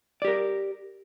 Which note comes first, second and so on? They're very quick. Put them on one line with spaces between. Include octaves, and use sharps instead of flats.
D5 G4 A#4